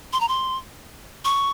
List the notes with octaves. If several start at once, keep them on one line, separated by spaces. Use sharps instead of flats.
C6
A#5
C6
C#6